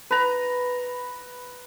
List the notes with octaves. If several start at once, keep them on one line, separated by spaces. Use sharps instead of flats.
B4 A#5